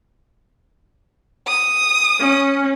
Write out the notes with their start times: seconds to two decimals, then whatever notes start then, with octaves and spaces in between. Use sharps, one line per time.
1.48 D#6
2.19 C#4